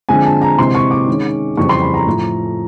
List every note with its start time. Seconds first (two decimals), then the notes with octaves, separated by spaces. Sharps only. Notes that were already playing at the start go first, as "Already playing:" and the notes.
0.09 D3 F3 G#3 C4 G#5
0.25 A5
0.42 A#5
0.58 C3 E3 G#3 C4 C6
0.75 C#6
0.91 D6
1.07 D#3 G#3 C#4
1.57 F2 C#3 E3 G3 C4 C#6
1.69 C6
1.82 B5
1.94 A#5
2.07 A2 F3